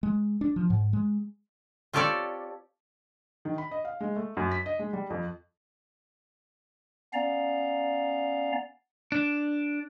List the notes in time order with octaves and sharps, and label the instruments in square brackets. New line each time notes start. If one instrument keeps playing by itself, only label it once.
[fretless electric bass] G#3
D4
F3
G#2
G#3
[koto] C4 F4 G4 A4 C#5 D5
[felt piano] D#3
B5
D#5
F5
G#3
A3
F#2
B6
D#5
G#3
G3
F2
[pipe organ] B3 C#4 D5 F5 A#5
[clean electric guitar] D4